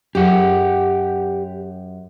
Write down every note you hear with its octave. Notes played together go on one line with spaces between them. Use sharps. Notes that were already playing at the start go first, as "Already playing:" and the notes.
F#2 G4 G#4 F#5